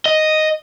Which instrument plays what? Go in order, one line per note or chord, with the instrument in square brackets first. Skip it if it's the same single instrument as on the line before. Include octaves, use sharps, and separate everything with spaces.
[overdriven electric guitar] D#5